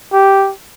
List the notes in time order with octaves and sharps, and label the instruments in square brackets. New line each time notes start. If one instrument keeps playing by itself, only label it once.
[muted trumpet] G4